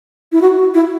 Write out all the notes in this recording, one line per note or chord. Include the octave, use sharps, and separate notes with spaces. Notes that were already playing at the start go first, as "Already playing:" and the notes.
E4
F#4
F#4
E4